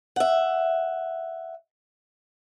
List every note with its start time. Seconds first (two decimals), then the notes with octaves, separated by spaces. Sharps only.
0.16 E5 F#5